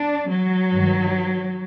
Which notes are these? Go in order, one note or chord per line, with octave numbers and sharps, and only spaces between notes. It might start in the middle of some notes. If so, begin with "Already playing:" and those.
Already playing: D4
F#3
G2 D#3